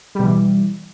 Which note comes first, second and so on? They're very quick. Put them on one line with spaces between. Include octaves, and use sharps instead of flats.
G3 B2 E3